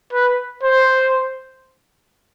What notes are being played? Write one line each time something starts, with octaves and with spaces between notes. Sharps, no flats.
B4
C5